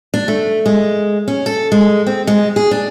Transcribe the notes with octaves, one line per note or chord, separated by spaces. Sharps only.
D4
A3
G#3
C#4
A4
G#3
C4
G#3
G#4
D4